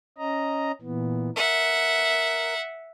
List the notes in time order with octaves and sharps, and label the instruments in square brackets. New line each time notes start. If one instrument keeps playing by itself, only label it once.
[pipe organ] C#4 D#5 A#5
A#2 E3 B3
[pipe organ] A#4 [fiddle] E5 F#5